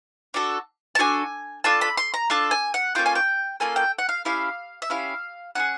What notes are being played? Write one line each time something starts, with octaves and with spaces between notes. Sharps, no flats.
D4 F#4 A4
A5
D4 F#4 A4 G#5
D4 F4 A4 A5
B5
C6
A#5
D4 F4 A4 A5
G#5
F#5
A#3 C#4 F4 A4 G5
G#5
G5
A#3 C#4 F4 A4 G#5
G5
F#5
F5
C#4 E4 G4 F5
E5
C#4 E4 G4 F5
C#4 E4 G#4 F#5